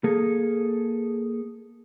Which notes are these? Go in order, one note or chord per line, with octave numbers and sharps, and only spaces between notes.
A#3 G#4 A4